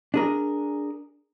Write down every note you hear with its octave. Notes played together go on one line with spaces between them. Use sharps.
D4 G#4 A#4